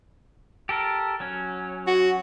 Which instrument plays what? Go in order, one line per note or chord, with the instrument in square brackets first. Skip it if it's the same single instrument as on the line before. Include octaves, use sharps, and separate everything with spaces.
[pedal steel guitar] G4 A4 A#4
F#3 C#4
[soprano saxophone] F#4